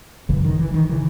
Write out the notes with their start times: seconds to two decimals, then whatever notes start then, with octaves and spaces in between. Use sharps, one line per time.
0.29 G#1 F#2 C#3 E3
0.45 D#3
0.59 E3
0.74 D#3
0.89 C#3 E3